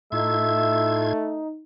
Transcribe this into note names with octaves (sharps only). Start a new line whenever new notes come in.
A2 A3 D#4 F4 E5 G#6